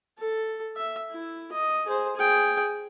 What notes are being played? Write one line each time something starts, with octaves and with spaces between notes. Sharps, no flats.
A4
E5
E4
D#5
G#4 C5
G#4 G5